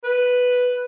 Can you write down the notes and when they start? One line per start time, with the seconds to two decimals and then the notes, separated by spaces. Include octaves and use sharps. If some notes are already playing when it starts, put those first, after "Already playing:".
0.04 B4